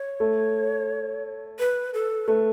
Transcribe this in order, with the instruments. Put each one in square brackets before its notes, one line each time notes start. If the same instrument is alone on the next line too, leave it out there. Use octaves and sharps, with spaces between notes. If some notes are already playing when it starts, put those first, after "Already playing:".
Already playing: [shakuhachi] C#5
[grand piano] A3
[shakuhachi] B4
A4
[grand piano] A3 [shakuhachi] B4